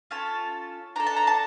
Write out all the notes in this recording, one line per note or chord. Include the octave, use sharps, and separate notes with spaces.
C#4 F4 A4 A5
D4 A4 A#5
A5
A#5
A5